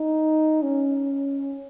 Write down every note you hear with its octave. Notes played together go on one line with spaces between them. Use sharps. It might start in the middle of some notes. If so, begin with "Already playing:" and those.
Already playing: D#4
C#4